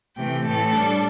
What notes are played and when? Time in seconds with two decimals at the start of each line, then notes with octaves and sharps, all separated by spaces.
0.16 C3 E3 A3 G5
0.44 A2 E3 A3 A4
0.73 A2 G3 D4